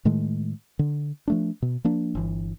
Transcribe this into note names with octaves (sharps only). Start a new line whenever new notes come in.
A2 D#3 G#3 A3
D3
F3 A3 D4
B2
F3 A#3 D4
G1 E3